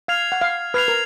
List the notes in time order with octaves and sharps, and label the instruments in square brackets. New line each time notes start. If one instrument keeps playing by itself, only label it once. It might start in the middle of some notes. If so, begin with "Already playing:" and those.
[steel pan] F5 [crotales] F6 G#6 C7 F7
[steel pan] F#5
F5
[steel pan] B4 [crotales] F6 G#6 C7 F7
[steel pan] A#4